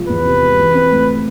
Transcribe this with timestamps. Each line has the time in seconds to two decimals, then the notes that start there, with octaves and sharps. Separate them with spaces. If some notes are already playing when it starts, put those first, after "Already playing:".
Already playing: C3 F3 G#3
0.09 E2 B4
0.25 C3
0.42 G#3
0.58 E3
0.74 C4
0.91 A3